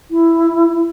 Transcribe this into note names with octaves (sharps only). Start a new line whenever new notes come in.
E4